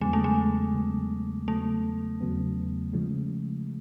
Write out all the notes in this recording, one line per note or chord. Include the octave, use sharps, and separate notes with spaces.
E2 C#3 F#3 G#3 B3
A3
G#3
E2 C#3 F#3 B3
E2 C#3 F#3 A3 B3
E2 C#3 F#3 B3
C#3 F3 G#3